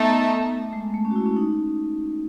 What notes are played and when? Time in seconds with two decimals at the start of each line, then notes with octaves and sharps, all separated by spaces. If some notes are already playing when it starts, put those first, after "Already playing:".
Already playing: A3 B3 D#4 A4 E5 A5
0.51 A3
0.73 G#3
0.94 A3
1.05 C#4
1.11 F#4
1.16 E4
1.26 C#4
1.36 D#4